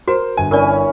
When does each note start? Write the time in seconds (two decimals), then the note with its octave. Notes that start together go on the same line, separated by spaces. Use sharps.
0.08 F#4 A#4 C5
0.37 G1 G#5
0.51 E3 C#4 A#4 D5